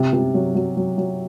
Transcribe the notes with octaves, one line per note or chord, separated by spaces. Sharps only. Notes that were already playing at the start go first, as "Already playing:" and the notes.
Already playing: C3
C3
F#3
F#3
F#3
F#3